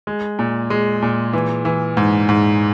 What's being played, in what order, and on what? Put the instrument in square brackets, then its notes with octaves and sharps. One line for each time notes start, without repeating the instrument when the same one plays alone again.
[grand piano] G#3
A#2
G#3
A#2
E3
E3
G#2
G#2